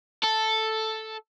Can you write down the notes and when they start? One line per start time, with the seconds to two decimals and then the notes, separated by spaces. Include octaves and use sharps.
0.23 A4